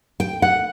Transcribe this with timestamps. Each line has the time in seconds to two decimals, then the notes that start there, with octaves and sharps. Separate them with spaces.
0.20 G5
0.42 F#5